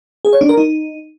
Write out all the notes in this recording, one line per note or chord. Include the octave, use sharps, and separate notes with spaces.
G#4
C#5
D4
A#4
D#4